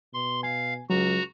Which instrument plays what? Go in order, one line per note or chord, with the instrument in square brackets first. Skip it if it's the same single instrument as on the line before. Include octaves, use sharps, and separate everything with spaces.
[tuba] B2 [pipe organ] C6
[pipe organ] F5 [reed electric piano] G#5
[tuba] C#2 [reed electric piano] F#3 [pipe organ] F#4 A#5